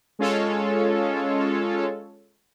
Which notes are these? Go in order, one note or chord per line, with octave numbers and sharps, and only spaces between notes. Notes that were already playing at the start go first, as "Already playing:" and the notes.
G#3 C#4 F4 A4 C#5